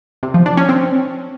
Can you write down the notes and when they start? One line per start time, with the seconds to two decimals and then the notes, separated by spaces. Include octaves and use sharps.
0.23 C3
0.34 F3
0.46 D4
0.57 C#4
0.69 C4